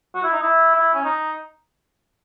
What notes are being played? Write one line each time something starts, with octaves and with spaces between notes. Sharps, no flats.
F#4
E4
D#4
E4
E4
C#4
D#4